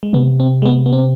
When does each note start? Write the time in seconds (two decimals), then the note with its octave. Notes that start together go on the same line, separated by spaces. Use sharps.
0.03 G#3
0.13 C3 B3
0.40 C4
0.62 G#3
0.66 B3
0.86 B3
0.93 C4